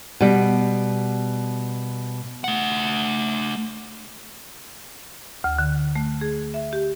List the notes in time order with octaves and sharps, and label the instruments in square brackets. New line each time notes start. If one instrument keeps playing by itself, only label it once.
[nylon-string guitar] B2 G3
[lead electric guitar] A3 F#5
[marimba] D2
D3
A3
G#4
E5
G4